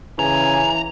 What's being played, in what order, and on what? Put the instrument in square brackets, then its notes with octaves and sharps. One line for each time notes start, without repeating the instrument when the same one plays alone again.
[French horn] C#3 [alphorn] E3 [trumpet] G#5 [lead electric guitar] A#5